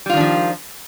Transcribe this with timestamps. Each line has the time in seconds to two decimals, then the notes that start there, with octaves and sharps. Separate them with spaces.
0.06 G3
0.09 F4
0.13 D#3
0.17 D4
0.20 F3